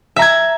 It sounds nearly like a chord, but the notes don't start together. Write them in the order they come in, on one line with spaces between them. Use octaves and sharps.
E5 A#5 G#6